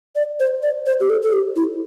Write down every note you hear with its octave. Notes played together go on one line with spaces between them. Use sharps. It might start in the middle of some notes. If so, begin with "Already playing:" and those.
D5
C5
D5
C5
G4
A4
A4
G4
E4